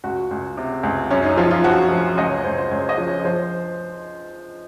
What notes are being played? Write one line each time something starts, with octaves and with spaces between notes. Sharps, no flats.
C#2 F#4
C#2
C3
C#2
F#2 C#4
D#4
F3 F4
F4
F3 F#4
F3
C#2 D#5
C#5
C#2 C5
C5
C#2 C#5
D#5
F3
C#5
F3 C5